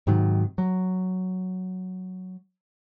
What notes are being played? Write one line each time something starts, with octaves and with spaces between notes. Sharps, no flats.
G#2 C3 D#3 F#3
F#3